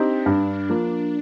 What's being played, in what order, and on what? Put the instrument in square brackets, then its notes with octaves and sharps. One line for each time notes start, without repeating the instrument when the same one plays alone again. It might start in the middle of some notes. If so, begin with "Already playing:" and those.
Already playing: [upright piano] C4 D#4 G4 [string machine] D4
[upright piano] G2
F3 A#3